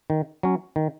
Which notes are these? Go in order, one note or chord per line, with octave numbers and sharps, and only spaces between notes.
D#3
F#3 C#4
D#3